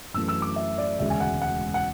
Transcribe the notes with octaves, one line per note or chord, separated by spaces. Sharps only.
F#2 E3 A3 E6
E6
D6
E5
D5
E1 D2 C#3 G#3 E5
G#5
F#5
F#5
F#5